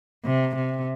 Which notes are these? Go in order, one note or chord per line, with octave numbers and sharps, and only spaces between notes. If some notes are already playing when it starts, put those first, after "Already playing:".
C3
C3